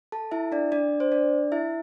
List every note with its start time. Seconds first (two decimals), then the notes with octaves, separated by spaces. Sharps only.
0.12 A4 A5
0.31 E4 E5
0.52 D4 D5
0.72 D4 D5
1.00 C5
1.12 D4 D5
1.52 E4 E5